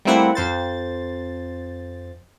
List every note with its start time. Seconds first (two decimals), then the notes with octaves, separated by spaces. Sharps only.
0.05 G3 A3 A#3 C4 E4 F#5
0.35 F2 C5 A6